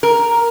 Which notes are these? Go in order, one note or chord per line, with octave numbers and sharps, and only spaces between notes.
A#4